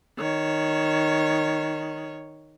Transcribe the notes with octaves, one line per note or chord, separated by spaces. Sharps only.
D#3 C#5